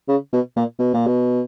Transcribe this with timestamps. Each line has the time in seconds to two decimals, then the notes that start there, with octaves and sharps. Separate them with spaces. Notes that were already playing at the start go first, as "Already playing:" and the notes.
0.08 C#3
0.33 B2
0.56 A#2
0.79 B2
0.94 A#2
1.07 B2